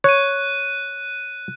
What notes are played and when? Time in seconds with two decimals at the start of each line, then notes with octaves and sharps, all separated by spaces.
0.04 C#5 F#6 D#7